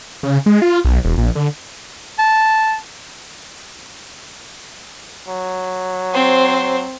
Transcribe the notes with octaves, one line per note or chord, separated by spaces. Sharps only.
C#3
G#3
F4
B1
E1
A#1
D3
A5
F#3
C4 C5